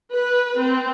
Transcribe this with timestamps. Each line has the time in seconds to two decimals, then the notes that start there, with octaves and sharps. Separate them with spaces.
0.12 B4
0.57 C4